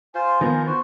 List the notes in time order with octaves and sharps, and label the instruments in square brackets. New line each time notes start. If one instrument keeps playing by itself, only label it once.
[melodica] F4 C5 [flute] G#5
[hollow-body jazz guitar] D#3 [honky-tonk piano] F3 B3 [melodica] F4 A#5
[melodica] F#4 C5